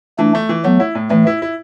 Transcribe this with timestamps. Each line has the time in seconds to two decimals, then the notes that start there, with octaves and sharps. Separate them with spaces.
0.19 E3 A3 D4
0.35 A3
0.49 E3
0.64 F#3 A3 B3
0.80 E4
0.95 A2
1.10 A2 E3 A3
1.27 E4
1.42 E4